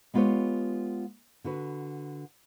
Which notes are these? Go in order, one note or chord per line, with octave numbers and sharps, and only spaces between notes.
G#3 B3 F4 G4 B4 C#5
D3 F#4 B4